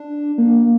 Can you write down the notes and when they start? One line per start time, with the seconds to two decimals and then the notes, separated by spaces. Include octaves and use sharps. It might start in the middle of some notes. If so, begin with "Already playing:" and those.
Already playing: D4
0.38 A#3